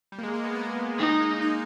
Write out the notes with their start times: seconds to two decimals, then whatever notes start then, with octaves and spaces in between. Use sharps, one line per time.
0.12 G3
0.19 A#3
0.23 G#3
0.34 A#3
0.44 B3
0.55 B3
0.99 A#3 D#4
1.09 G#3
1.20 A#3
1.30 A#3
1.42 D#4